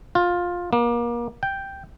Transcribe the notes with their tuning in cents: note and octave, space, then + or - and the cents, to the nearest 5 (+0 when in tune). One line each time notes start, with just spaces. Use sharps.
F4 +15
A#3 +30
G5 +0